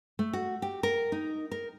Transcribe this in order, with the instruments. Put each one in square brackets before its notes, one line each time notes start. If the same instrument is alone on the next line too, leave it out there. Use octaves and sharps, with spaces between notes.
[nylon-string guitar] A3
F#4
G4
A#4
D#4
A#4